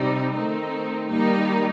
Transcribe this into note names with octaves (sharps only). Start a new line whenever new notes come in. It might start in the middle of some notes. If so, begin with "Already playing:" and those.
Already playing: C3 G3 C4 D#4
D#3 A3 C4 D#4
D#3 G3 A#3 D#4